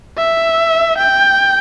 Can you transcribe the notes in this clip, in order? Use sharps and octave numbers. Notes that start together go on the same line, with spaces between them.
E5
G5